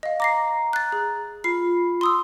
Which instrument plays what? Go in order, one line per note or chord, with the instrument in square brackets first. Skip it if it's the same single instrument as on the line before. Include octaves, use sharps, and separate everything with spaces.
[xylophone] D#5 F5
[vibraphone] A#5 [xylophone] D6 A#6 C7
[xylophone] F#6 A6
G#4
[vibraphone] F4 B5 [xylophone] C7
[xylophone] C6 D#6 E6